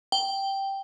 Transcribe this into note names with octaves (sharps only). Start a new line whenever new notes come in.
G5